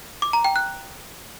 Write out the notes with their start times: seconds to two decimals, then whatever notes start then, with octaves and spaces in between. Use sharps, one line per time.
0.22 D6
0.33 A#5
0.44 G5
0.56 F#6